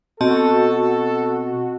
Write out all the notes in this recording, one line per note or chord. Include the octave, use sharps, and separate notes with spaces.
B2 C4 F#4 A4 D#5 A5